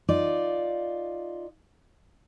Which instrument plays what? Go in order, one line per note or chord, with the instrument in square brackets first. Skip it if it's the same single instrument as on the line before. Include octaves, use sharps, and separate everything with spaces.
[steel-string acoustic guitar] D#4 F4 D5